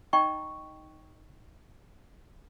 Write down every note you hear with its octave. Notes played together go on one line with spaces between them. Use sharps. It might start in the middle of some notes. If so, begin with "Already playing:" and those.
D#4 D#5 G5 A#5 C#6